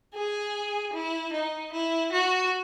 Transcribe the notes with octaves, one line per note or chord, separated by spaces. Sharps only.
G#4
E4
D#4
E4
F#4